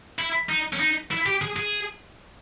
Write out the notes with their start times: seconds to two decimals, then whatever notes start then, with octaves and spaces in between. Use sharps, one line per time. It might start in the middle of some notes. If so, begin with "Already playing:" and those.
0.18 E4
0.49 D#4
0.73 C#4
0.80 D#4
1.11 E4
1.26 G4
1.42 G#4
1.57 G#4